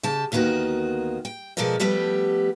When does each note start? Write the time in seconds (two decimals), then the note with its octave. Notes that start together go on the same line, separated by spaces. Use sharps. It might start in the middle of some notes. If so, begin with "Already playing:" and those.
0.03 C#3 G4 A5
0.32 D2 D#3 A#3 B3 F#4
1.25 G5
1.57 B2 F3 G#3 A4 A#4 D5
1.80 F3 G3 A3 B3 G4